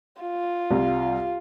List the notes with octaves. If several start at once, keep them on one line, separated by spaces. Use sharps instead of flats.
F4
C2